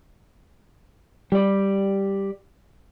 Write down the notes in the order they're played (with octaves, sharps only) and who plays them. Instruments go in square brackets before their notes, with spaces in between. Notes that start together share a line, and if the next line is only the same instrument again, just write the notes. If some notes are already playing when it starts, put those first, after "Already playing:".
[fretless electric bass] G3 [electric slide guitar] G4 D5